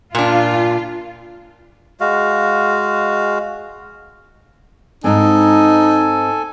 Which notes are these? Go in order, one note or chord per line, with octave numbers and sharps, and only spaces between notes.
A#2 D4 F4
G#3 F#4 F5
G#2 C4 D#4 A4 G#5